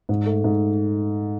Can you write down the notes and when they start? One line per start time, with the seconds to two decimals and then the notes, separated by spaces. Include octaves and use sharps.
0.09 G#2
0.26 A3
0.44 G#2